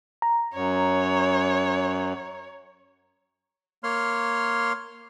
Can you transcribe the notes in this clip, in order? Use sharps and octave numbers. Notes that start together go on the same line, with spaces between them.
A#5
F#2 C#5
A#3 C#5 C6 F6